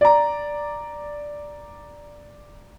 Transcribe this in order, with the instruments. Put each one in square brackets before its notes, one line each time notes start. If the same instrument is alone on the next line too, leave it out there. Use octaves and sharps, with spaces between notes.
[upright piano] D5 A#5